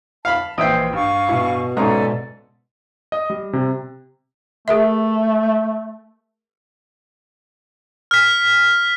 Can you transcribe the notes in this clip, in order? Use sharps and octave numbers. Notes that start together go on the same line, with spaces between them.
F5 A5 B5
A#1 E3 C5 D#5 E5 G5 D7
G2 F5 G#5 C#6
B2 E4
G#2 C#4 A4 D5 E5 G#5 A#5
D#5
G3
C3
A3 G#4 A#4 E5
F6 B6